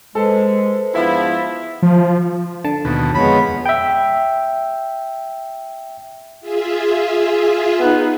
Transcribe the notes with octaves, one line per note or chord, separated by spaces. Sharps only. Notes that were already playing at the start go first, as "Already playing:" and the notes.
G#3 A4 B4 C5
G#2 F3 B3 D4 E4 F4 E5
F3
D3 A5
D#2 B2
F2 G#3 B3 C#5 B5
E5 G5
F4 G#4 E5
B3 D#4